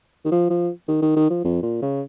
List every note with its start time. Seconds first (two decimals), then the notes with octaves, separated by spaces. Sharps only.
0.25 D#3
0.32 F3
0.50 F3
0.88 D#3
1.02 D#3
1.16 D#3
1.30 F3
1.45 F2
1.63 A#2
1.82 C#3